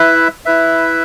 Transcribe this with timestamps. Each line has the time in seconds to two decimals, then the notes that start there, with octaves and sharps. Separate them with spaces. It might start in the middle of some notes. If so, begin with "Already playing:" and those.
Already playing: E4 B4 E5
0.45 E4 B4 E5